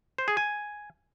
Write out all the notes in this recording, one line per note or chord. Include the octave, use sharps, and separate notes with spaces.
C5
G#4
G#5